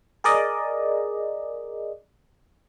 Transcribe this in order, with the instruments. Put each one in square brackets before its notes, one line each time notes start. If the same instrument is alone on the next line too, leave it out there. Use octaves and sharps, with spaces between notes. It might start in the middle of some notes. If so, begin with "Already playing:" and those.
[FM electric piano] G#4 A#4 D5 D#5